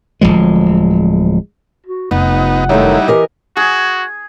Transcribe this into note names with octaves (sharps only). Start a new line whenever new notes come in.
D1 C2 F3 G#3
F#4
F1 B3 D#4 F#5
F#2 D#3 G3 A3 D#4 E4
E3 G4 A#4 D#5
F#4 G#4